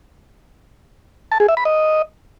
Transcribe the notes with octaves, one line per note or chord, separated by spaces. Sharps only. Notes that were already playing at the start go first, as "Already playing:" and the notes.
A5
G#4
E5
B5
D#5